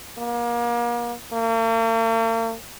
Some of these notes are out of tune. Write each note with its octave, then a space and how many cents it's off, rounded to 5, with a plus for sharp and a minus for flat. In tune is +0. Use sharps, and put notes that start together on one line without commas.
A#3 +35
A#3 -45